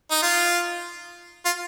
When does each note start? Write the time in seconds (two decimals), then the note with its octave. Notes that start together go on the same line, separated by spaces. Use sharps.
0.11 D#4
0.22 F4
1.45 F4